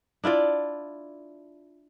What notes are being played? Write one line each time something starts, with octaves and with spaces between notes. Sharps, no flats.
D4 E4 F4 D5